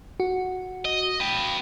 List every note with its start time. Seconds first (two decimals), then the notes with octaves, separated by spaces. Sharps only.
0.20 F#4
0.85 D#5
1.20 B4 G5